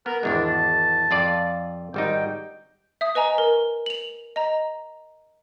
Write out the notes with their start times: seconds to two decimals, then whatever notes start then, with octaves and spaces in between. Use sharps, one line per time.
0.06 B3 A#4
0.23 G#1 E2 G#3 D4
0.44 A5
1.11 F2 F4 D5
1.94 G#1 G3 D#4 G5
3.01 E5 D#6
3.15 B4 D#5 G#5 A#5
3.38 A#4
3.86 F7 F#7
4.36 D#5 A#5